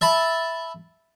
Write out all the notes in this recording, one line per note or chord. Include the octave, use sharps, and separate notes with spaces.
E5 A5 B5